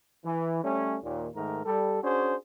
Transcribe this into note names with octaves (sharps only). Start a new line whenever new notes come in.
E3
G3 A3 C#4
D#2 A#2
G#2 D#3 A3 A#4
G3 A4
C#4 D4 F#4 G#4 C5